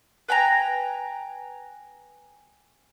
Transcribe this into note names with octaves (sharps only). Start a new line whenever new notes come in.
B4 G5 G#5 A#5